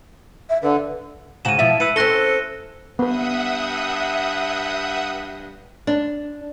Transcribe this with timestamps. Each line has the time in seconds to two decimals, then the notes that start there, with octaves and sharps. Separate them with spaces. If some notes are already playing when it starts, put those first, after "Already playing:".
0.50 E5
0.63 D3 B4
1.45 G#2 C#3 F#4 D#7 E7
1.59 B2 F3 E4 E5
1.80 E4 B4 E6 C#7 D#7
1.96 C4 C#4 A4 F#6 A#6 G7
2.99 G2 B3 B4 E5 F#5 D#6
5.87 D4